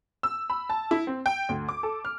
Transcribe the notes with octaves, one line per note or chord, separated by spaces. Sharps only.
E6
B5
A5
E4
C4
G5
D2
D6
A4
F6